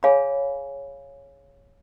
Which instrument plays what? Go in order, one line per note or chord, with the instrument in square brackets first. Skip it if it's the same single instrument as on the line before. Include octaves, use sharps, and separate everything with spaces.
[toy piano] G#4 C#5 F5 G#5 B5